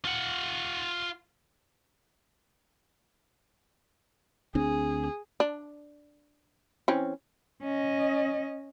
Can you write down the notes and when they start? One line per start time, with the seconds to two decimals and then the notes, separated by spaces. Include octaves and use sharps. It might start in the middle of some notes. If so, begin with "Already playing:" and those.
0.05 F4 F#5
4.55 D2 C4 D4 G#4
5.40 D4
6.88 E3 C4 C#4
7.63 C#4 D#5